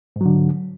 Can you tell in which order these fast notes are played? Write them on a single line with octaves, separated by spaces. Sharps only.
G#2 F#3 D3